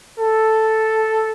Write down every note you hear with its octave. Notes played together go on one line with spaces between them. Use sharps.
A4